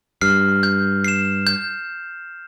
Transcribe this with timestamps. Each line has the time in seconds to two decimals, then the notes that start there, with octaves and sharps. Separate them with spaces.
0.21 G2 F6 C7
0.63 G6
1.05 C7 E7
1.47 G6